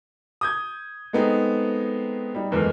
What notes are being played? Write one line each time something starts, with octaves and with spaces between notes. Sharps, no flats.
D#6 G6 G#6
G#3 A3 B3 C4 D#4 G#4
G3 D#4
F#1 E2 E3 G#3 A4 F6